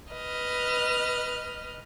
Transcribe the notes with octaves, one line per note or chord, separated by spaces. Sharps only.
B4 D#5 F6